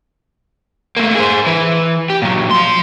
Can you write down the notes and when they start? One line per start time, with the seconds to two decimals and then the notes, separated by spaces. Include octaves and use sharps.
0.97 A3 A#3
1.15 G#4 C5
1.47 E3 B4
2.10 G4
2.22 A#2 F#3
2.51 F3 C6